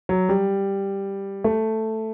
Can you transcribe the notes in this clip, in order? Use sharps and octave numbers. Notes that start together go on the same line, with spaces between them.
F#3
G3
A3